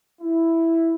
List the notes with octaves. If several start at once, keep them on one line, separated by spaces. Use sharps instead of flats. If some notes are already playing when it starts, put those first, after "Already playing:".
E4